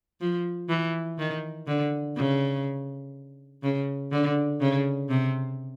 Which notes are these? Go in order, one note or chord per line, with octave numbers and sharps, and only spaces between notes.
F3
E3
D#3
D3
C#3
C#3
D3
C#3
C3